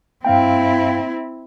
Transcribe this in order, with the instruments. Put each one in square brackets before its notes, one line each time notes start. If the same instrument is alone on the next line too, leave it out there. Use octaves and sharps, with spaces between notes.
[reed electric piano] G2 F5 G5 [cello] C4 E4